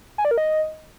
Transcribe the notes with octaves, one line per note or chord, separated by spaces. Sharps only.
G#5
D5
A#4
D#5